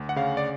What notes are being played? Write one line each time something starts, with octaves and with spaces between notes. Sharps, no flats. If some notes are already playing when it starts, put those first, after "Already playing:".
Already playing: D2
F#5
C#3 F5
D5